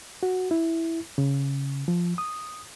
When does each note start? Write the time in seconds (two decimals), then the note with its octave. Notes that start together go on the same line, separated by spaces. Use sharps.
0.23 F#4
0.51 E4
1.18 C#3
1.88 F3
2.18 D#6